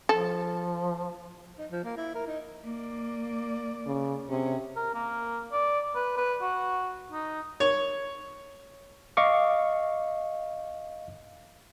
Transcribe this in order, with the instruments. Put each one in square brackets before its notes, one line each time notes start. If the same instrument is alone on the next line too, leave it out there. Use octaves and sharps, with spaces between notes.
[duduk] F3 [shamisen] A4
[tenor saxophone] D#4
F3
A#3
E4
A#4
D#4
[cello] A#3 D5
[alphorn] C#3
[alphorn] C3 [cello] C#4 G#4
[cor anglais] A#4
A#3
D5
B4
B4
F#4
D#4
[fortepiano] C#5
[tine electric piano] D#5 F5 C#6 D6